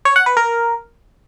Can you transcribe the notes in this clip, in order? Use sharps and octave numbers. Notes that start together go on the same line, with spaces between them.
C#5
F#5
B4
A#4